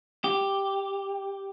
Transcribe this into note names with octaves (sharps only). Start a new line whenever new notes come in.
G4